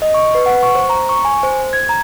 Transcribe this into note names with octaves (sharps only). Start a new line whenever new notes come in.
D#5
C#6
B4
F#5
C#6
C5
A#5
C#6
G#5
C5
G#6
A#5